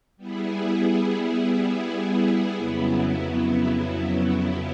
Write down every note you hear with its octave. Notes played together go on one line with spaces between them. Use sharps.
G3 B3 E4 G#4
F2 C#3 F#3 B3 E4